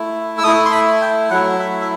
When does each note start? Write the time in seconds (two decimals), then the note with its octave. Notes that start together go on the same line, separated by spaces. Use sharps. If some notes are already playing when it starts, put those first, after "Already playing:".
Already playing: A3 E4
0.38 E6
0.44 A3 E4 D#6
0.65 C6
0.72 B5
1.02 G5
1.30 F#3 A3 E4 F#5
1.59 E5
1.81 E5